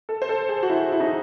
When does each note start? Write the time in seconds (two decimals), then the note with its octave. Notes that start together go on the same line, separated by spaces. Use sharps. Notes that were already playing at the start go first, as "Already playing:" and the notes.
0.09 A4
0.22 C5
0.29 A4
0.49 G#4
0.63 F#4
0.70 E4
0.92 E4
1.00 D#4